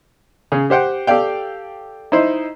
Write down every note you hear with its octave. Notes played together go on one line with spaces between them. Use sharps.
C#3 G#4
G4 C5 F#5 G5
G4 A4 D5 F5 G5
D#4 E4 C5